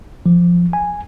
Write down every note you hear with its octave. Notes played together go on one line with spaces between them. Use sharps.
F3
G#5